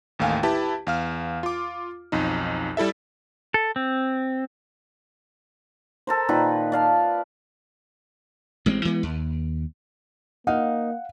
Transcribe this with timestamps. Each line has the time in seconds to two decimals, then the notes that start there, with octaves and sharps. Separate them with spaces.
0.19 A1 D#2 A3 F5 G5 G#5
0.43 E4 G4 B4 A5
0.87 E2 F5 F6
1.43 F4 D6
2.12 B1 F2 D#4
2.77 G3 E4 A4 E5
3.54 A4
3.76 C4
6.07 A4 A#4 C5
6.29 A#2 D#3 D#4 B4
6.72 D5 F5 A5
8.66 A1 G#3 B3 C4
8.85 E3 G#3 B3
9.03 D#2
10.47 A#3 D#4 F5 F#5